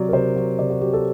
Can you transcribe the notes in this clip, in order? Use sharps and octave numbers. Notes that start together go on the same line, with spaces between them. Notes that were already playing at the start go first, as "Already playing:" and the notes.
Already playing: C3 F#3 D5
A#4
C3 C5
F#3
C3 D5
F#4
F#3 G4
A4